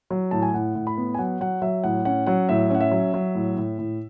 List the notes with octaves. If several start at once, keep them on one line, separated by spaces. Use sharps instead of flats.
F#3
A2 A5
G#5
A2 F#5
A2
B5
B3
G#5
F#3 F#5
F#3 F#5
F#3 E5
A2 F#5
C#4 F#5
F#3 F#5
A2 E5
C#4 F#5
E5
F#3
F#3
A2
A2
A2